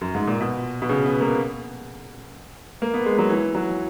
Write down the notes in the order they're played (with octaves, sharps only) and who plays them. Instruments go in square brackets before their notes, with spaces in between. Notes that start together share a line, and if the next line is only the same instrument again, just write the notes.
[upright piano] F#2
G#2
A#2
B2
B2
C#3
B3
A#3
A#3
B3
G#3
F#3
E3
F#3